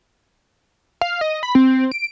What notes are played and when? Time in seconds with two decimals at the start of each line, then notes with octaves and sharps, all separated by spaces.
1.01 F5
1.21 D#5
1.43 B5
1.55 C4
1.92 D7